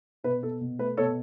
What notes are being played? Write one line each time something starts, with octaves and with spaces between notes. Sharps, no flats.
B2 B4
B2 A4
B2
A3 B4
B2 A4 C#5